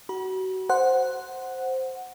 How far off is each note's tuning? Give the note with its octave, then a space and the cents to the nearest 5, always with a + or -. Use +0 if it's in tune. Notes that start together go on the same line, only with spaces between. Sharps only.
F#4 +25 B5 -45
C5 +0 F#5 +0